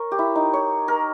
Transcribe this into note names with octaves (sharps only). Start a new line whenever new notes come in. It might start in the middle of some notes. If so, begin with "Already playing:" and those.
Already playing: A#4 C#5
G4
E4
D#4
C#5
A#4